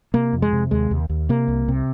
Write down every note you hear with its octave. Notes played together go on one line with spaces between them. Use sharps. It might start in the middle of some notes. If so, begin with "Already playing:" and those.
C3 A#3
F2
G#3
C3
D#2 G#3
D#2
D#2
C3 A#3
C2
C3